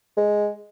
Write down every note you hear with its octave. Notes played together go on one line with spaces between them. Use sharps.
G#3